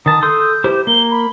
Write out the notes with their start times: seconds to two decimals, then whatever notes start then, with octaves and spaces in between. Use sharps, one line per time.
0.06 D#3 A5 D#6
0.23 A4 C6 D#6 G6
0.40 G6
0.64 E4 G4 C5
0.87 A#3 G7
1.11 B5